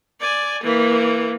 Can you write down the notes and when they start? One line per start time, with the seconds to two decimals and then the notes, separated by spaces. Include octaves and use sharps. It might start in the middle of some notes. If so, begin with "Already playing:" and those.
0.20 D5 G#5
0.63 E3 A#3